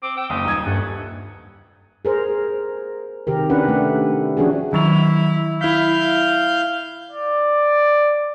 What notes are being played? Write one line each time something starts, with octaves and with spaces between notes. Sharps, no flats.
C4 D6
G5 E6
F#1 D#6
D#1 D#4 G#6
G2 A3 F#5
G#4 A#4 C5
C3 D#3 G4 A#4
C#4 D4 B4 F#5
A3
F3 C#4 D4 F#4 G#4
D#3 F#3 E4 F7
E4 F5 G6 B6
D5